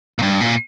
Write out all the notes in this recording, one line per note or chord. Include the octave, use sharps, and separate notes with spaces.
A#2
G2
A#2